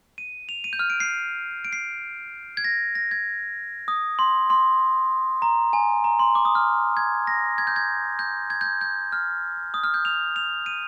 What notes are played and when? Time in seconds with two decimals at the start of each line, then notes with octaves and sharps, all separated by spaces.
0.18 D#7
0.49 F7
0.64 D#7
0.73 G6
0.79 F6
0.90 D7
1.00 C7
1.65 D7
1.73 C7
2.57 G#6
2.64 A#6
2.95 A#6
3.11 G#6
3.88 D#6
4.19 C6
4.50 C6
5.42 A#5
5.73 G#5
6.04 A#5
6.19 C6
6.35 D6
6.45 D#6
6.55 F6
6.97 G#6
7.27 A#6
7.58 G#6
7.67 G6
7.76 G#6
8.19 G6
8.50 G#6
8.61 G6
8.66 G#6
8.81 G6
9.12 F6
9.74 D#6
9.84 F6
9.94 G6
10.05 F7
10.36 F7
10.66 D#7